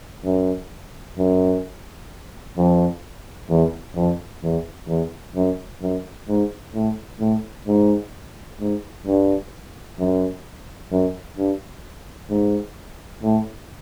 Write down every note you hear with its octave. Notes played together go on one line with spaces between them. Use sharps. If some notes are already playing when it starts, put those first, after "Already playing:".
F#2
F#2
F2
E2
F2
E2
E2
F#2
F#2
G#2
A2
A2
G#2
G#2
G2
F#2
F#2
G2
G#2
A2